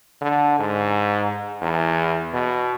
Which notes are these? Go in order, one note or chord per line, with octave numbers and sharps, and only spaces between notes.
D3
G#2
E2
B2